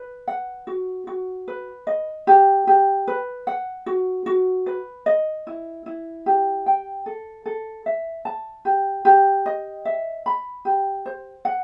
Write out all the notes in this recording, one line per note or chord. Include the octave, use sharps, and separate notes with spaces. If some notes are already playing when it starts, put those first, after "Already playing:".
Already playing: B4
F#5
F#4
F#4
B4
D#5
G4
G4
B4
F#5
F#4
F#4
B4
D#5
E4
E4
G4
G5
A4
A4
E5
A5
G4
G4
D#5
E5
B5
G4
C5
F#5